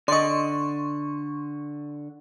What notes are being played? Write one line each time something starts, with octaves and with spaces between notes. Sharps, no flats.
D3 D5 D#5 C6 C#6